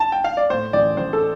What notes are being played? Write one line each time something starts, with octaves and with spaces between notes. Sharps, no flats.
A5
G5
F5
D5
A2 C5
A1 D5
A1 C5
A4